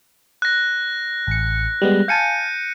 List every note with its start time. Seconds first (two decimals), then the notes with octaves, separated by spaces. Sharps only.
0.42 F#6 A#6
1.27 A1 C#7
1.82 G3 G#3 B3
2.08 F5 G#5 A5 G6 C#7 D#7